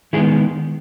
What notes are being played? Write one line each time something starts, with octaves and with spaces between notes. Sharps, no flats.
D#3 G#3 B3 E4 G#4